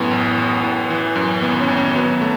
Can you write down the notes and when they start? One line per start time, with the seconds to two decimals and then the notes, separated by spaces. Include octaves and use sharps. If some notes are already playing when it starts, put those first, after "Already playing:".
Already playing: F#2 A2 B3
0.11 A1
0.37 A1
0.63 A2
0.90 E3
1.16 F#2
1.42 G#1 B3
1.61 C#4
1.69 G#1
1.77 C#4
1.96 F#3 B3
2.21 A3